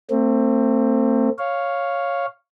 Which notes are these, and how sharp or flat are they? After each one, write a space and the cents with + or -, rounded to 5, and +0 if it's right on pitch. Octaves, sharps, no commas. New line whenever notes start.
A3 +40 C4 +10
C#5 +0 F5 +0